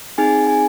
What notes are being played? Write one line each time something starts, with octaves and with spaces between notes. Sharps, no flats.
C4 D#4 G#4 G#5
G#5